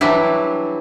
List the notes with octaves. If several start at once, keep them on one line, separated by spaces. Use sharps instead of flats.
E3 F#3 G3 D4 E4